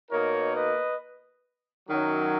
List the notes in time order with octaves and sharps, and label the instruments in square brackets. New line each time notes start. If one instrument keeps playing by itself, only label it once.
[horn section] B2 A#3 D#4 A#4 C#5
B4 D#5
F#2 D#3 F#3